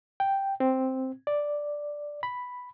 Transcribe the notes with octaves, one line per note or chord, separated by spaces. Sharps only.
G5
C4
D5
B5